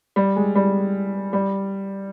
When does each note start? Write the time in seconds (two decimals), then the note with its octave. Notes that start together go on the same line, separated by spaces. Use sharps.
0.16 G3
0.36 G#3
0.55 G3
1.33 G3